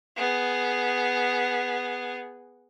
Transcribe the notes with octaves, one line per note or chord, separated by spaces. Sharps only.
B3 G#4